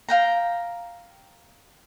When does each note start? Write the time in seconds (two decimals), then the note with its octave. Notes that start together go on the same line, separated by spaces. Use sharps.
0.09 F5 G5 A#5